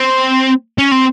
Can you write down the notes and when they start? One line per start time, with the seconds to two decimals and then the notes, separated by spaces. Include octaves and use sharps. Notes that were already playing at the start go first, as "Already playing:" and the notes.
Already playing: C4
0.78 C#4
0.92 C4